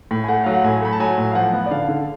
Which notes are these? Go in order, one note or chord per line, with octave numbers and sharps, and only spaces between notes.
A2
G#5
A3 F#5
F#3 F5
F#5
A2 G#5
A3 B5
A5
F#3 G#5
A2
F5
F3 F#5
B3
D5
D3 F5
D3